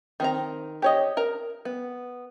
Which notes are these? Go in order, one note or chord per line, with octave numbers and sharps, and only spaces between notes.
D#3 C4 A#5
G4 C#5 D#5
A#4 A#5
B3